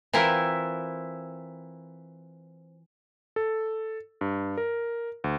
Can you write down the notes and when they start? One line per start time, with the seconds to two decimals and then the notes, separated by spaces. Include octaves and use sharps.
0.13 E3 C4 E4 F4 A#4
3.36 A4
4.21 G2
4.57 A#4
5.24 D2